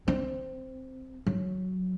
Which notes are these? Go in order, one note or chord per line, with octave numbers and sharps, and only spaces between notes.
C4
F#3